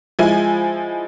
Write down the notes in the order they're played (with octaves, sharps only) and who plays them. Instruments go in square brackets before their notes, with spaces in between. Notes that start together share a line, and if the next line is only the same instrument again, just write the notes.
[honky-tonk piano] F3 G#3 E4 G#5